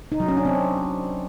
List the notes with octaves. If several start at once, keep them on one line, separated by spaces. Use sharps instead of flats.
D#4
F#3
C#4
D4
C4